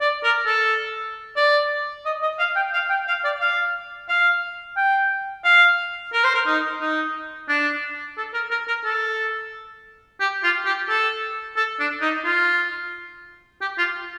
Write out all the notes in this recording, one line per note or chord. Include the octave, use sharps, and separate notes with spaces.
D5
A#4
A4
D5
D#5
D#5
F5
G5
F5
G5
F5
D5
F5
F5
G5
F5
A#4
C5
A#4
D#4
D#4
D4
A4
A#4
A#4
A#4
A4
G4
F4
G4
A4
A4
D4
D#4
F4
G4
F4